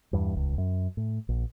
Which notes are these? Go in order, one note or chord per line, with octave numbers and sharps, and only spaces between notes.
E2 G2
D#1 C#2
F#2
A2
A#1